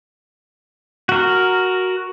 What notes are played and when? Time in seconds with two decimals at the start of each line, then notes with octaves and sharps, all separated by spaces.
1.09 F#4 A#4